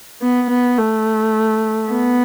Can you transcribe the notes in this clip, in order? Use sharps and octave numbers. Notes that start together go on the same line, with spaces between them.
B3
B3
A3
B3